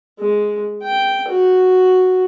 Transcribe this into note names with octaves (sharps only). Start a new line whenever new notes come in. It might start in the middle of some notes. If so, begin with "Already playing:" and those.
G#3
G5
F#4